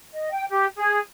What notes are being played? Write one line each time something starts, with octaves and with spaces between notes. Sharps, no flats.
D#5
G5
G4
G#4